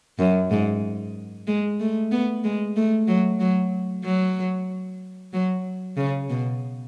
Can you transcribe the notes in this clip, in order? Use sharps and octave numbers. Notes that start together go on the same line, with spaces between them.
F#2
G#2
G#3
A3
B3
G#3
A3
F#3
F#3
F#3
F#3
C#3
B2